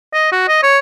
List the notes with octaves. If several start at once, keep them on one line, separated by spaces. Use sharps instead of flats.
D#5
F#4
D#5
C#5